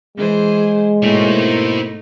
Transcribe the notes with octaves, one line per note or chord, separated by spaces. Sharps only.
E3 G#3 G#4 C5
G#2 B2 A3 A#3 D#4 E4 C5 C#5